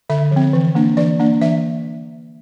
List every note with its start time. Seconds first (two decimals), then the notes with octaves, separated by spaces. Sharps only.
0.10 D3 E5
0.31 F3
0.36 C4
0.53 E3
0.75 A#3 D4
0.97 E3 D5
1.19 A#3 D4
1.41 E3 E5